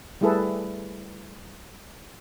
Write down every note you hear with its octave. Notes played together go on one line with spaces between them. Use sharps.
G3 A3 E4 G#4 A4 B4